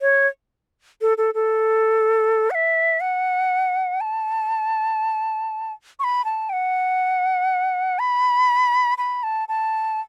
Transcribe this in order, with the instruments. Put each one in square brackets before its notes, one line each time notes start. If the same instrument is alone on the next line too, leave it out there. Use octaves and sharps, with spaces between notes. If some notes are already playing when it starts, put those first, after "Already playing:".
[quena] C#5
A4
A4
A4
F#5
E5
F#5
A5
C#6
B5
A5
G5
F#5
B5
B5
A5
A5